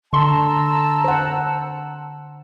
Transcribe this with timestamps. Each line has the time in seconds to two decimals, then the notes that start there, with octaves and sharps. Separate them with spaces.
0.13 D3 A5 A#5 C6 E6
1.04 C5 F#5